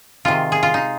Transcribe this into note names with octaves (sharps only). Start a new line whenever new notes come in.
C3 D#3 G#3 F4
G#4
F4
D#4